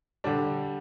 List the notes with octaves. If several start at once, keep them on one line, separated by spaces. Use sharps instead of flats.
D3 G3 D4